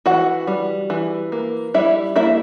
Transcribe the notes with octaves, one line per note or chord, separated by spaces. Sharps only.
E3 F#4 F#5
G3
E3
A#3
G3 E4 E5
A#3 E4 E5